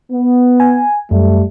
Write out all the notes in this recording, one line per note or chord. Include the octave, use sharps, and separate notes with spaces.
B3
G#5
F#2 G3 A3